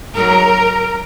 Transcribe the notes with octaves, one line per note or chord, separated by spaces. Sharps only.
G#2 F#3 A#4